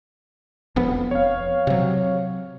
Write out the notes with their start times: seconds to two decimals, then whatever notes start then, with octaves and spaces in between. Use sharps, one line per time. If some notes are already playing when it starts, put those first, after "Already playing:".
0.76 E1 F2 B3
1.11 C#5 F5
1.67 C3 F#3